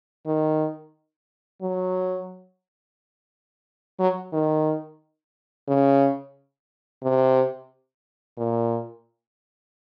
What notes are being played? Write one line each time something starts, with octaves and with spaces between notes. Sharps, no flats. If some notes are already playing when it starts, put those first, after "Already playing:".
D#3
F#3
F#3
D#3
C#3
C3
A#2